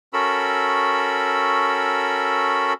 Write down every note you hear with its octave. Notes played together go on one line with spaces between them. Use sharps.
C#4 F#4 A4 A#4 B5 E6